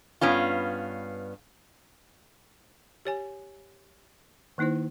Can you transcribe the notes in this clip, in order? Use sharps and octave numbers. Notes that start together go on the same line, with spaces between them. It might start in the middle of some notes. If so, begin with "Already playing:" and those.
G2 B3 C#4 F4
G4 C#5 G#5
D#3 A#3 D#4 E4 C5